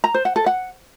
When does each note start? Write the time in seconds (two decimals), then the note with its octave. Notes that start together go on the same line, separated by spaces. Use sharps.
0.04 A#5
0.14 C5
0.25 F#5
0.36 A4
0.46 F#5